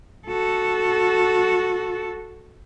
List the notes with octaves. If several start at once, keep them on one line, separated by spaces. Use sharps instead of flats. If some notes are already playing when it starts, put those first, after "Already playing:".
F#4 A4